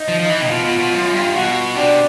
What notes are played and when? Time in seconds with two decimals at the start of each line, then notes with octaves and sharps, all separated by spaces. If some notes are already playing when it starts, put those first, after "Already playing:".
Already playing: D#4
0.08 F3
0.19 F3
0.30 E3
0.41 C3
0.46 A#2
0.50 B2 F4
0.64 B2
0.79 B2
0.92 F#2
1.14 G2
1.35 B2 F#4
1.76 C3 D4